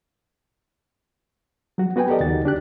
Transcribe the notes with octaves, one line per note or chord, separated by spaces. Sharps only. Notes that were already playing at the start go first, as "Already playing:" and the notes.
F#3 F#4
B3 F#4 B4 G5 G#5
G4 A4 A#4 D5 D#5
D#2 C#3 D#4 F#4 A6
D2 D4 G4 F#6